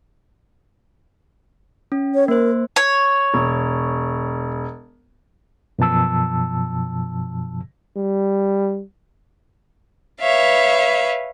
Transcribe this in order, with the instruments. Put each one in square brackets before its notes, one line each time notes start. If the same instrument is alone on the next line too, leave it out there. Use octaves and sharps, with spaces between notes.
[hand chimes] C#4
[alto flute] C#5
[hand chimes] A#3 C5 [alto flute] A#4
[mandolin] C#5
[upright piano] E1
[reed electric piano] F#2 B2 F3 A5 E6
[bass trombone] G3
[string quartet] B4 C#5 E5 F5